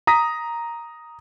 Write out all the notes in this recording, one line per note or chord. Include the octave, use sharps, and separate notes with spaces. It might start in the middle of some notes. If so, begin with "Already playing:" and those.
A#5 D#6 A#6 B6